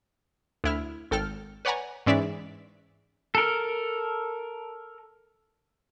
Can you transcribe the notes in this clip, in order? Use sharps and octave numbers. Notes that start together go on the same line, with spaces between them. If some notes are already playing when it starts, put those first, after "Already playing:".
D2 E4 F6
G#1 A4 G5 F6
B4 C#5 D5 F#5 G#5 A#5
G#2 E3 C#4 D5 E5 B6
A4 A#4